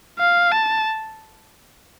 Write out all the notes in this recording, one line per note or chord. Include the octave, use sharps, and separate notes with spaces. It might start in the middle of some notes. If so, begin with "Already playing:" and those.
F5
A5